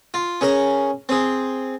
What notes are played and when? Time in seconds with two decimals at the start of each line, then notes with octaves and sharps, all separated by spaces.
0.14 F4
0.41 C#4 G#4 A#4
1.09 C4 G#4